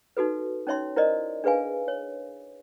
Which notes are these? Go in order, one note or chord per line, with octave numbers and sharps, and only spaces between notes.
D#4 F#4 A4 B4
C#4 D#4 C#5 E5 C6
E4 A#4 C5 D5 D#5
D4 G#4 B4 F5 G#5
C#5